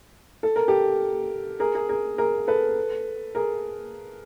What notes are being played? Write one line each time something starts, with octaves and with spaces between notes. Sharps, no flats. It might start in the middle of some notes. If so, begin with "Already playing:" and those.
A4
A#4
G4 A4
G#4 A#4
G#4 A#4
G#4 A#4
G#4 A#4
A4 B4
G#4 A#4